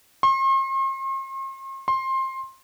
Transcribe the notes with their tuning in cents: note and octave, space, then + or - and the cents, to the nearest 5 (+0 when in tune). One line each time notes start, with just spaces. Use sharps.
C6 +45
C6 +20